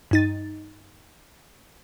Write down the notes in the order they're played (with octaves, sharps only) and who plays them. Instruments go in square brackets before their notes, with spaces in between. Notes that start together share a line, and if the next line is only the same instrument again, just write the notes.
[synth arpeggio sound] G2 D#4 A6